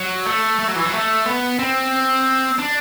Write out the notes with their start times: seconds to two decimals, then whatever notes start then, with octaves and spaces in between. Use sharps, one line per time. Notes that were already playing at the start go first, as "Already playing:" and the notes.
Already playing: F#3
0.25 A3
0.59 A3
0.68 F#3
0.75 E3
0.85 F#3
0.93 A3
1.25 B3
1.59 C4
2.59 D4